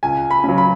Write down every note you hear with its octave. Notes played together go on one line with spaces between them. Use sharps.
C#2 G#5
B5
C#3 F#3
B5